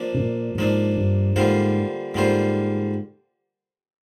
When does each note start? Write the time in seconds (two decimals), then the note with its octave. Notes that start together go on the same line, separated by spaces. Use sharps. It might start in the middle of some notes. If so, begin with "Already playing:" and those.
Already playing: F3 A#3 D4
0.15 C3
0.20 A#2
0.55 G2
0.58 G#2 F3 A#3 D4
0.97 G2
1.36 G#2 D3 G3 A#3 F4 C5
2.14 G#2 D3 G3 A#3 F4 C5